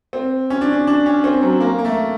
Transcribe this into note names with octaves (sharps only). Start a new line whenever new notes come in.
C4
C#4
D4
C#4
D4
C#4
C4
F#3
A#3
A#3
A3